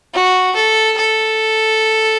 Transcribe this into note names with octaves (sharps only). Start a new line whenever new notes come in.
F#4
A4
A4